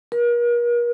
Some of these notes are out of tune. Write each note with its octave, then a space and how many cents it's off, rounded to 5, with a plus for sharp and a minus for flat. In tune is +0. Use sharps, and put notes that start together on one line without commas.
A#4 +40